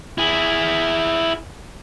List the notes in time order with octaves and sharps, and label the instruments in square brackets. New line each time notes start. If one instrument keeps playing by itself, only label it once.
[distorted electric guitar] E4 G#4